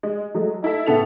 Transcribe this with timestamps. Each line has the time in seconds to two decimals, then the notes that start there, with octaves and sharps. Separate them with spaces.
0.03 G#3
0.34 F#3 G#3 A3
0.63 D#4 E4 A4 E5
0.86 A2 C#3 B3 A4 E5 F7